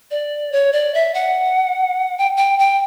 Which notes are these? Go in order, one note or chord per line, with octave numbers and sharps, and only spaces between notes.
D5
C#5
D5
E5
F#5
G5
G5
G5